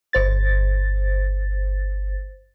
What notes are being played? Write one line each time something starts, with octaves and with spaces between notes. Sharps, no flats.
G1 C5 A6